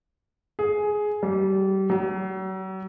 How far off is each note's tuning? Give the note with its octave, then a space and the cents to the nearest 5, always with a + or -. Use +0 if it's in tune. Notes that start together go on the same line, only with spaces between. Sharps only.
G#4 +10
G3 -30
F#3 +40